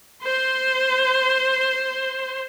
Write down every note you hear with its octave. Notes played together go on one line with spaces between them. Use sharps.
C5 C6